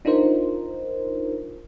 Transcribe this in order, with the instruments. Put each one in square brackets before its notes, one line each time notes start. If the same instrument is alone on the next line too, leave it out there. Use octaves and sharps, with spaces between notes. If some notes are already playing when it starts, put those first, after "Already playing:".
[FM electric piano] D4 D#4 F4 A#4 C5